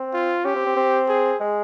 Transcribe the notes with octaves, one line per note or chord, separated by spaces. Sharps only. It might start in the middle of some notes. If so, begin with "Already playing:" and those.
Already playing: C4
F4
C#4 G4
C4
C4
C4
G#4
G#3